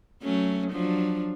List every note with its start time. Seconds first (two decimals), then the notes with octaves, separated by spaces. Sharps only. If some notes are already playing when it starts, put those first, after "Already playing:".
0.23 F#3 A3 C#4
0.71 F3 F#3 D4